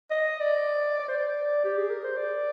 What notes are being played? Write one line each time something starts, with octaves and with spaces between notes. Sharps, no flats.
D#5
D5
D5
C5
D5
G4
G#4
A#4
C5
D5